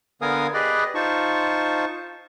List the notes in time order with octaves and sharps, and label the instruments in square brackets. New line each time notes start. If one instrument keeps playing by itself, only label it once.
[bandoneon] D3 B3 A#4 F5 G#5 D#6
G4 G#4 B4 D5 D#5
D#4 F4 C5 A5 C#6